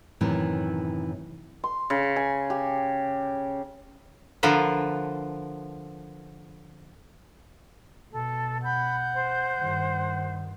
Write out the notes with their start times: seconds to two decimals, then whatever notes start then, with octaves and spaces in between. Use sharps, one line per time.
0.21 F#2 A2 C3 D#3 E3
1.64 C6
1.90 C#3
2.16 G#5
2.50 G4
4.43 D3 F3 A#4 B4
8.12 B2 A4
8.64 F#5 B5 G6
9.14 C5
9.58 G2 D#3